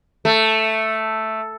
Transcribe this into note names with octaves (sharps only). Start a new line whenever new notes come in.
A3